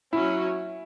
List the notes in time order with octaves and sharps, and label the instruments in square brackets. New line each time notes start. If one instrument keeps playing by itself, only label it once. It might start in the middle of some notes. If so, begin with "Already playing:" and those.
[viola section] F#3 C#4 F#4 [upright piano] E4